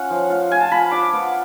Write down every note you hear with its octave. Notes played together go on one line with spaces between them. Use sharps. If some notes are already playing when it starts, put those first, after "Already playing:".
Already playing: C#4 F4 F#5
F3
F4
F4 G#5
A5
F4 B5
D4 D6
B3